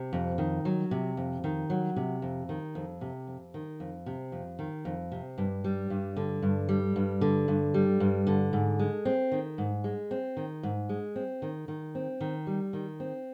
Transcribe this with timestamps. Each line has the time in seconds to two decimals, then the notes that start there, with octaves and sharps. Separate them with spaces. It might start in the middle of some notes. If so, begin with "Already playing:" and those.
Already playing: C3
0.13 F2
0.38 D#3
0.65 F#3
0.91 C3
1.17 F2
1.44 D#3
1.70 F#3
1.96 C3
2.22 F2
2.49 D#3
2.75 F2
3.01 C3
3.27 F2
3.54 D#3
3.80 F2
4.06 C3
4.32 F2
4.59 D#3
4.85 F2
5.12 C3
5.38 G2
5.64 G3
5.90 G2
6.17 D3
6.42 G2
6.69 G3
6.96 G2
7.21 D3
7.48 G2
7.74 G3
8.00 G2
8.27 D3
8.53 G#2
8.79 G#3
9.05 C4
9.32 D#3
9.58 G#2
9.84 G#3
10.11 C4
10.37 D#3
10.63 G#2
10.89 G#3
11.16 C4
11.42 D#3
11.68 D#3
11.95 C4
12.21 D#3
12.47 G3
12.73 D#3
13.00 C4